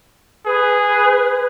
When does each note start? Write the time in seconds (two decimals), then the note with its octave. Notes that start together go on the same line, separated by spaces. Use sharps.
0.46 G#4 B4